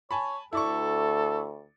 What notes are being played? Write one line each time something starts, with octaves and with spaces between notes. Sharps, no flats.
C#5 G#5 A5 B5
D2 E4 A4 D5 C#6